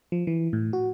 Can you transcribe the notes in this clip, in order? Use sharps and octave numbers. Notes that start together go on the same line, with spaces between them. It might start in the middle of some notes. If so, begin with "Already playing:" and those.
F3
E3
A2
F#4